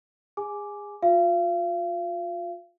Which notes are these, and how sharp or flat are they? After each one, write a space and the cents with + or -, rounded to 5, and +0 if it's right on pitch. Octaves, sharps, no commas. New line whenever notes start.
G#4 -30 G#5 +10 D6 +0
F4 +30 F5 -35